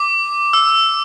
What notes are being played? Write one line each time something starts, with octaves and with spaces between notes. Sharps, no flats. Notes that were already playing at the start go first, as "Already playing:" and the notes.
Already playing: D6
E6